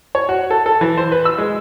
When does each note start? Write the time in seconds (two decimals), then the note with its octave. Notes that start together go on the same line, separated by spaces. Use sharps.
0.15 C#5
0.29 F#4
0.50 A4
0.66 A4
0.81 E3
0.97 C5
1.12 B4
1.25 E6
1.38 G#3